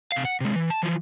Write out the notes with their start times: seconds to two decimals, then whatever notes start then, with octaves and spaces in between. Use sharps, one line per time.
0.12 C3 F5
0.25 F#5
0.41 C3 G#3
0.55 E3
0.70 A5
0.83 E3 F3